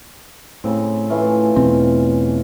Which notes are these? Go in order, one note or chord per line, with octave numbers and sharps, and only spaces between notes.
A2 C#3 C4
E3 A3 F4
E2 B2 C4